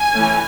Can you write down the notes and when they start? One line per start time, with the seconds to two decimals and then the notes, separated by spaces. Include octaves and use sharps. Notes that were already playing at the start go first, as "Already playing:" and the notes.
Already playing: G#5
0.13 E3 A3 C#4